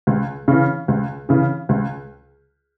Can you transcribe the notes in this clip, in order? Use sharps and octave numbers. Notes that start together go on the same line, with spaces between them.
C#2
C#3 E3
C#2
C#3 E3
C#2